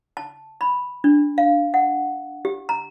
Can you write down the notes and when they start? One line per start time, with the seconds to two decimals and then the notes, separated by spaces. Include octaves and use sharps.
0.17 A5
0.61 B5
1.04 D4
1.38 F5
1.74 F#5
2.45 G4
2.69 A#5